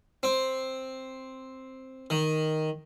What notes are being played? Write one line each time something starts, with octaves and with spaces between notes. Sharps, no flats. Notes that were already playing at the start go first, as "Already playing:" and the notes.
C4
D#3